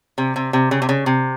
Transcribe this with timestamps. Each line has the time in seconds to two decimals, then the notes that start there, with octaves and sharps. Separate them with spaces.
0.18 C3
0.36 C3
0.53 C3
0.71 C#3
0.82 C3
0.89 C#3
1.06 C3